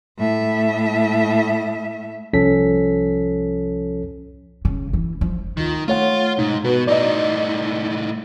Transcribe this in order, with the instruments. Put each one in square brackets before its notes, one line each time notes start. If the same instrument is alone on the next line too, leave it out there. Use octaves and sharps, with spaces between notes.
[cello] A2 E5
[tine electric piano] C2 F3 C#4 A4 B6
[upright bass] C#3
E3
F3
[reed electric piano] D2 F4 [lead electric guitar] D#3
[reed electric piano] A3 C#5 F#5 [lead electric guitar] F4
[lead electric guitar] G#2 [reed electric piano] B2 D#4
[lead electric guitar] B2 [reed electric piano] F#4 B4
[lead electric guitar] A2 D#4 [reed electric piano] D5 D#5